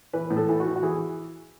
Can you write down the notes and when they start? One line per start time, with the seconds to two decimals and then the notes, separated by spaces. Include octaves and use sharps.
0.13 E3 B4
0.30 A2
0.37 A4
0.49 E3
0.60 F#4
0.66 E3
0.76 F#4
0.83 E3 G#4